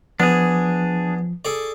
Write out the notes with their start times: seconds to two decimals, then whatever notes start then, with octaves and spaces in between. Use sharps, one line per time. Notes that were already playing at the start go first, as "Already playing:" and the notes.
0.20 F3 B3 D4 G#4
1.45 G#4 A4 D5